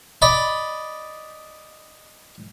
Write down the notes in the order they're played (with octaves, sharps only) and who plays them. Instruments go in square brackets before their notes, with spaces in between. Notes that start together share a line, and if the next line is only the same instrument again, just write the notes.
[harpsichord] D5 D#5 B5